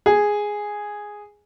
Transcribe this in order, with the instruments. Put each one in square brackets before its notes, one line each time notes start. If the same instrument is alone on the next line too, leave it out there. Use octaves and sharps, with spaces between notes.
[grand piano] G#4